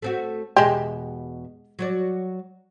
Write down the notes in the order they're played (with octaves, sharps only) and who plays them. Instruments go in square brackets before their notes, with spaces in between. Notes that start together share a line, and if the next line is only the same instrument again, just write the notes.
[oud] A3 C4 F#4
[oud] E2 B2 E5 [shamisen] G#3 G4
[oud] F#3 F#4 D5